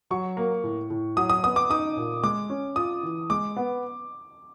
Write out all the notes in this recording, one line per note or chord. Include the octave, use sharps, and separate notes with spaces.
F#3 C#6
A#3
A2
A2
F#3 D#6
D#6
B3 D#6
D6
D#4 D#6
A#2
G#3 D6
C#4
F4 D#6
E3
G#3 D6
B3